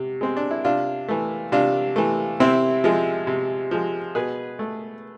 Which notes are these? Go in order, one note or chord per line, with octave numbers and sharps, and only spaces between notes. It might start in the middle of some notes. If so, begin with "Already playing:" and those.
Already playing: C3
G#3 C4
D4
E4
C3 D4 F4
E3 A3
C3 D4 F4
E3 A3
C3 C4 E4
F3 G#3
C3
F3 G#3
B2 G#4 B4
A3